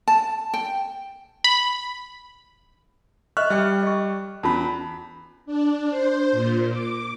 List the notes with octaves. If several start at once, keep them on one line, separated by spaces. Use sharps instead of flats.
A5
G5
B5
D#5 E5 C#6 F6 F#6
G3 D5 G5
D#5 C#6
E2 C#4 F4 A5 B5
D4
C5
A#2
D6